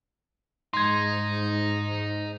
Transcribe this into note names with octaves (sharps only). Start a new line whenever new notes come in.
G#2 D#4 C6 G#6